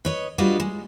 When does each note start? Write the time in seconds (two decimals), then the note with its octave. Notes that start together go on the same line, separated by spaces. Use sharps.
0.05 B4 C#5 D#5
0.38 G3 D4 F4 F#4 B4 D#5
0.60 G#3